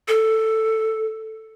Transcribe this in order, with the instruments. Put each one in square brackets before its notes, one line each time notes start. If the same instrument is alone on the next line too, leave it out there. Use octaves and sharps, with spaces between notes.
[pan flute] A4